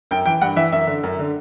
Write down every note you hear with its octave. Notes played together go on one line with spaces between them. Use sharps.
F#2 G5
E3 G5
G2 F#5
E3 E5
F#2 E5
D3
F#2
D3